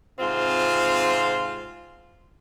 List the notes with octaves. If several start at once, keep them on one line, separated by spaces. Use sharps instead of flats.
G#2 C3 C4 F4